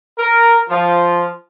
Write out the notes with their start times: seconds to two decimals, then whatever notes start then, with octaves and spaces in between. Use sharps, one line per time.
0.18 A#4
0.69 F3